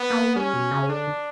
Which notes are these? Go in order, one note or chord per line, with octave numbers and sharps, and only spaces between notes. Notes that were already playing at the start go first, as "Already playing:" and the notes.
Already playing: B3
A#3
G3 C#4
B2
C#3
D3 D4